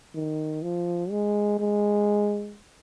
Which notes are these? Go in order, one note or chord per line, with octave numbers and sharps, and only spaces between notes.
D#3
F3
G#3
G#3